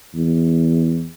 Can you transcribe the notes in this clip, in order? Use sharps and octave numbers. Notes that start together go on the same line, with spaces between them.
E2